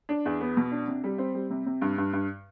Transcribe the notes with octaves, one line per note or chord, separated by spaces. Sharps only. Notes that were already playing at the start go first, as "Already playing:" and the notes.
D4
E2
B3
B2
D4
C3
G3
C4
G3
C3
C3
G2
G2
G2